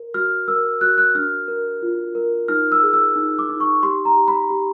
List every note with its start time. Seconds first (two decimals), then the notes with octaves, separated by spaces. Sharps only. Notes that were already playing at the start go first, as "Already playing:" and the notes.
Already playing: A#4
0.14 F#4 F6
0.48 A#4 E6
0.81 F#4 F#6
0.98 F#6
1.15 D4 F6
1.48 A#4
1.82 F4
2.15 A#4
2.48 D#4 F6
2.72 E6
2.83 G#4
2.93 E6
3.16 D#4
3.39 D6
3.50 D#4
3.60 C#6
3.83 G4 C6
4.05 A#5
4.17 G4
4.28 B5
4.50 G4